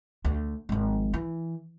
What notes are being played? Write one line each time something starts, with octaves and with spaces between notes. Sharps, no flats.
D2
G#1 F3
E3